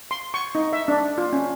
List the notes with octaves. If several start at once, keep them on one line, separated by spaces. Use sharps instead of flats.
C6
C#6
D#4
E5
D4
F4
C#4